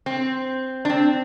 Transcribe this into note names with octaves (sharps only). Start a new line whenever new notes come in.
C4
D4
C4